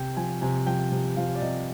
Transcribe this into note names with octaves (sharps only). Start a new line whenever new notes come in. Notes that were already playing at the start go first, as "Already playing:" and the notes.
Already playing: C3 G5
F3 G#5
C3 G#5
F3 G5
C3
F3 F5
D5
C3 D#5